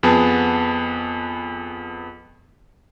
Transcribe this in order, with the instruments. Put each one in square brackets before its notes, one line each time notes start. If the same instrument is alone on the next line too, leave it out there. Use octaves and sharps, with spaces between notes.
[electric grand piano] F2 B3 G#4 A5